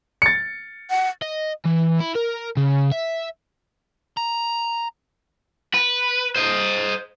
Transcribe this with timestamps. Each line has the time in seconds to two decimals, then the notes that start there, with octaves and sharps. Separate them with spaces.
0.22 A6 C#7
0.90 F#5
1.22 D#5
1.65 E3
2.00 E4
2.16 A#4
2.57 C#3
2.91 E5
4.17 A#5
5.74 B4
6.36 C5 D#5